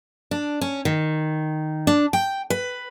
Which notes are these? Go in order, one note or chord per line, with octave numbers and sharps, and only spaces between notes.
D4
C#4
D#3
D4
G5
B4